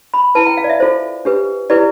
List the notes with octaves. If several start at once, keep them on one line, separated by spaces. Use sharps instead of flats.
B5
E4 B4 A5
G5
F5
D5
E5
F4 A4 C5
D4 G4 B4
E4 G4 B4 D5